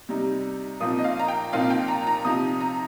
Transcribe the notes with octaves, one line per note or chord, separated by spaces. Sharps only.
C3 G3 D#4
A#2 F3 C4 D#4 D#6
D#5
F5
A#5
G5
A#2 F3 C4 D#4 F5
G5
A#5
A#5
C3 F3 D#4 D#6
A#5